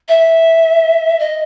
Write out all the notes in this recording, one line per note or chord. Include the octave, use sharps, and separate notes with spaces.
E5
D#5